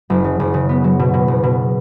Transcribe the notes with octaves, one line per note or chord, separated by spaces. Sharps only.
F#1
C#3
F#1
C#3
B3
F#3
B2
B2
F#1
B2